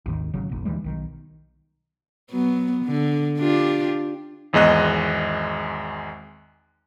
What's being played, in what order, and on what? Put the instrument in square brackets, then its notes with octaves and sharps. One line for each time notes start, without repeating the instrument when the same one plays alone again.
[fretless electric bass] G#1 D#2 D#3
G#1 C#3 F#3
F#1 B1
D2 E3 G3 G#3
B1 D#3
[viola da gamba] F#3 B3
D3
D4 F4 G4
[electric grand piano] G#1 E2 G#3 D#5 F#6